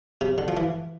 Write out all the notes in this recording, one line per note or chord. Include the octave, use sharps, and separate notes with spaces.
C3
D3
F3
E3